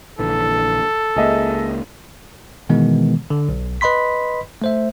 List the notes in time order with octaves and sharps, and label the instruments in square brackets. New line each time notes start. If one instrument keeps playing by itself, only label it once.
[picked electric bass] A#1 D3 E3 [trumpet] A4
[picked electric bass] C#2 A#3 [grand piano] G#4 D#5 E5
[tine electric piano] B2 D#3 E3 G#3 B3
D3
B1
B4 D#5 B5 C6 B6
A3 C5 E5